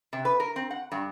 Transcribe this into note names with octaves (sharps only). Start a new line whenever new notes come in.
C3
B4
A#4
C4
F#5
G2